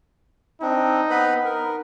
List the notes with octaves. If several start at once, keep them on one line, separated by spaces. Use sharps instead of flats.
C4 D4 D#4
B3 B4 B5
A#4